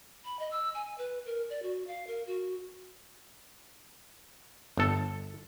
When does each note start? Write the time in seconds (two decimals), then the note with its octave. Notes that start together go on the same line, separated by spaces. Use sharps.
0.25 B5
0.39 D#5
0.51 E6
0.75 G#5
0.98 B4
1.26 A#4
1.50 D5
1.63 F#4
1.87 F5
2.07 A#4
2.27 F#4
4.78 G1 A4